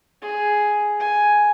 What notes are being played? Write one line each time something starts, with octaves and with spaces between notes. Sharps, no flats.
G#4
G#5